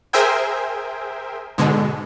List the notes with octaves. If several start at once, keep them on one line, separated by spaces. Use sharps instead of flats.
G#4 A#4 C5 E5 G5 G#5
G#2 B2 D3 G#3